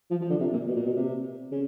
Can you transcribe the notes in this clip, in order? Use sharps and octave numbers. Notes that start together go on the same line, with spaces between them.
F3
F3
D3
C3
A#2
B2
A#2
B2
C3
C#3